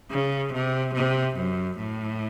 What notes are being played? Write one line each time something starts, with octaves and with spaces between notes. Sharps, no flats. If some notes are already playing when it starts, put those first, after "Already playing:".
C#3
C3
C3
F#2
A2